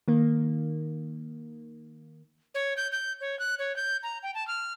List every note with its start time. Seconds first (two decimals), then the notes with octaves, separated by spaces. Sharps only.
0.08 D#3 A#3
2.55 C#5
2.77 G6
2.92 G6
3.21 C#5
3.39 F#6
3.59 C#5
3.76 G6
4.03 A#5
4.23 G5
4.35 A5
4.48 F6